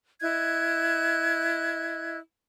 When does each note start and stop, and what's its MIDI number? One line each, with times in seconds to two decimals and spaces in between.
0.21 2.17 64
0.21 2.17 75
0.21 2.17 90
0.21 2.17 92